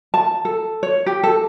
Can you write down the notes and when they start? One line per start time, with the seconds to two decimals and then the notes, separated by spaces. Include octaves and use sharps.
0.14 A5
0.45 A4
0.83 C#5
1.06 G4
1.23 A4